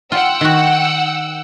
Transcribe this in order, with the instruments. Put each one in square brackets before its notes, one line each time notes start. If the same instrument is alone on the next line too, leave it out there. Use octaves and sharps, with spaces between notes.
[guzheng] F4 [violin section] F#5 G5 E6
[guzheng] D#3 F#4